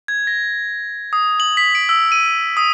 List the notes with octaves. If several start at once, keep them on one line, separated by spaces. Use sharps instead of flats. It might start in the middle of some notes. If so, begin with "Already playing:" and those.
G#6
A#6
D#6
F#7
B6
D7
E6
D#7
D#6